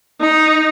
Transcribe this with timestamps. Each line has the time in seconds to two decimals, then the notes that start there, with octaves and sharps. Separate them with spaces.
0.21 D#4